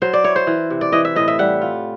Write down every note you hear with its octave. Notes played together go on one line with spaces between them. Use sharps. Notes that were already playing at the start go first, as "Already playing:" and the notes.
F#3 C5
D5
E4 C#5
C5
E3
C3
D5
E3 D#5
E5
A2 D#5
E5
G3 F#5
F4